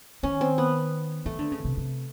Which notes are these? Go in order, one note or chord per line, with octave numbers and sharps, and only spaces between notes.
D#3 C#4
C4
B3
D#3 A3
D3
C#3
C3
C3